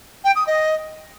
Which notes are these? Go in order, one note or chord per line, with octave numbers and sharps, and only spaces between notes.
G5
D#6
D#5